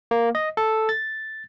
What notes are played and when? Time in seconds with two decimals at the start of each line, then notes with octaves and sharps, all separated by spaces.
0.11 A#3
0.35 D#5
0.57 A4
0.89 A6